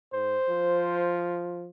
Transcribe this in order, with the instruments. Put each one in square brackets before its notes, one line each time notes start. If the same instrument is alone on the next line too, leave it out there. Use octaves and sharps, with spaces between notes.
[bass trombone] G#2 [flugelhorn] C5
[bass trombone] F3